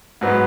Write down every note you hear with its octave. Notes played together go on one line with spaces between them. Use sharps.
G#2 F#3 B3